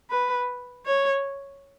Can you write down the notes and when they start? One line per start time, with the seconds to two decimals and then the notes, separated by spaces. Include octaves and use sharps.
0.10 B4
0.86 C#5